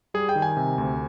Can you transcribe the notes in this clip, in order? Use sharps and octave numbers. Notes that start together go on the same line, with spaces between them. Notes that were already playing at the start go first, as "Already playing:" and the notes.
G3 G#4
G5
D#3
G#5
C3
D2